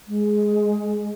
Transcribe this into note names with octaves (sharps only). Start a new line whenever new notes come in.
G#3